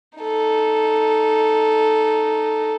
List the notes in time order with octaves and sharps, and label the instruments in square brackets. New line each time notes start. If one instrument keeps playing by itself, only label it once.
[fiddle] D#4 A4